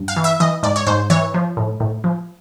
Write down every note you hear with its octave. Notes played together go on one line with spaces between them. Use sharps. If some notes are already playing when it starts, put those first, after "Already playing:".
Already playing: G2
F5
E3
E5
E3 D#5
G#2 D5
C#5
G#2 C5
E3 C#5
F3
A2
A2
F3